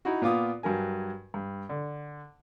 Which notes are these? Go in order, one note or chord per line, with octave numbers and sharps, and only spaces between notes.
D#4 E4 F#4
A#2 B3 F4 F5 D6 D#6
G2 F#3 A#4 G#5
G2
D3